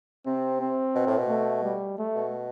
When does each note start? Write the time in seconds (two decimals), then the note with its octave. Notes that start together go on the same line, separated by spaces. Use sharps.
0.26 C3 C4
0.61 C4
0.95 B2
1.07 A2
1.18 B2
1.29 A3
1.64 G3
1.99 A3
2.15 B2